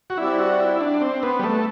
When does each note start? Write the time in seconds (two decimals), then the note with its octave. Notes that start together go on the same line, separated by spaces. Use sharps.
0.10 F#4
0.18 G3 C4 E4 G4 D5
0.38 F#4
0.60 E4
0.81 D4
1.01 C4
1.23 B3
1.39 G3
1.43 A3